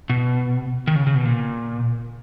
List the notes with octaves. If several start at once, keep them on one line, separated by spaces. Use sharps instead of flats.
B2
D#3
C#3
C#3
B2
A#2